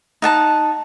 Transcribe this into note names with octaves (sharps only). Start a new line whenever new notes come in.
D#4 F#5 A5 A#5